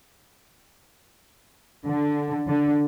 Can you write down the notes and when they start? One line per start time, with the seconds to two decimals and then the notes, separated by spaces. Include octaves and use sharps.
1.87 D3
2.48 D3